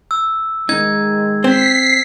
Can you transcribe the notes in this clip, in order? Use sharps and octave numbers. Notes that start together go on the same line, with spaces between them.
E6
D#3 G#3 D#4 G#6
C4 B6 C7